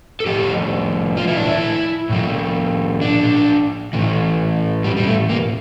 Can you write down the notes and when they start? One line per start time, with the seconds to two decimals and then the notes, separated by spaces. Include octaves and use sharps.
0.20 A4
0.26 A2 F3 G4
1.17 F4
1.27 E4
1.37 D4
1.47 E4
2.09 A2 F3
3.01 D4
3.93 A2 E3
4.84 G3
4.97 G3
5.07 A3
5.29 A#3